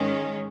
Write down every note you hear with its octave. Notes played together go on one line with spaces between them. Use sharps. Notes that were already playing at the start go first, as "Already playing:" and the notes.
Already playing: G#2 D#3 G#3 C#4